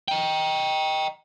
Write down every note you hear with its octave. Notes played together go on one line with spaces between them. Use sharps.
D#5 G5